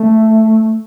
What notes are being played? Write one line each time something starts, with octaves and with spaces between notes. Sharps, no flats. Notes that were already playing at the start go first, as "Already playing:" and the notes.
Already playing: A3